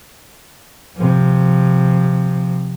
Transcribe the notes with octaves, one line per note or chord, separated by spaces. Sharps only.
C3 F3